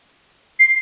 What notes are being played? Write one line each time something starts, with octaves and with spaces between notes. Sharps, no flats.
C7